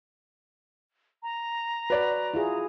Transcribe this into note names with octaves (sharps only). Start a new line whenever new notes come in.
A#5
F#4 B4 D5
E4 F4 G#4